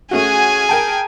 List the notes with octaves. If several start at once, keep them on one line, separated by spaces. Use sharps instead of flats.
A3 C#4 F#4 G#4 G#5
A#4 G5 A5